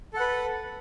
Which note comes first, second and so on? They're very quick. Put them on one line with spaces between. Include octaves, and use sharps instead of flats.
A4 F#5 B4